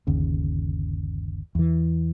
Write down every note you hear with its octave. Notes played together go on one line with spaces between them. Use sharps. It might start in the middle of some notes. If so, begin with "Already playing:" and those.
G1 D#2 C#3
E2 E3